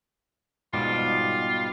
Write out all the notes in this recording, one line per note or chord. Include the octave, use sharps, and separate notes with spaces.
G#2 B2 G3 F4